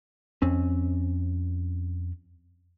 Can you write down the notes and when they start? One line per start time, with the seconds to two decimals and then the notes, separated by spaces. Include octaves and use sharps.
0.42 F2 C4 C#4